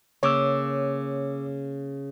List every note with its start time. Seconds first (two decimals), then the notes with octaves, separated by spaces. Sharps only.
0.23 C#3 A#3 C#5 D6 E6